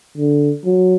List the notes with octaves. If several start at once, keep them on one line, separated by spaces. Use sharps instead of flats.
D3
F#3